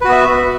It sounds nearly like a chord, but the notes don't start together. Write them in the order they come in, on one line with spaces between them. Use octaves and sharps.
B4 F#4 B3 E5